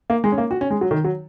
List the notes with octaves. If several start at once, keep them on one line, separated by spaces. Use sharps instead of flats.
A#3
G#3
C#4
A#3
F#4
C#4
G#3
F#3
D#3
F#3